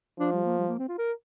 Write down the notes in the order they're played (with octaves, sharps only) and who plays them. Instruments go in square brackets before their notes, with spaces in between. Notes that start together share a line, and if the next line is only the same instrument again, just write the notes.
[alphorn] F3 [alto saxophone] D4
[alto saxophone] G3
A#3
G3
A#3
C4
F4
A#4